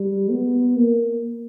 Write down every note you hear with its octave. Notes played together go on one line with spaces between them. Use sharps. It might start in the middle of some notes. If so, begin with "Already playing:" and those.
Already playing: G3
B3
A#3